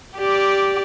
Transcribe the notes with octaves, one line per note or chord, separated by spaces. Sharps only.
G4 D5